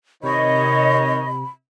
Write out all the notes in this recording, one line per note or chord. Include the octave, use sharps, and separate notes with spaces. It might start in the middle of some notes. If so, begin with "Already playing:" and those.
C3 D#3 C#5 D#5 B5